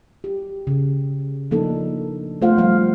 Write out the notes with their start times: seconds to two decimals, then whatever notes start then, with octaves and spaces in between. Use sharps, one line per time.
0.24 G4
0.67 C#3
1.51 F3 A#3 D4 D#4 A4
2.42 A3 B3 F4 C5 F5 F#5
2.57 F3 G3 F5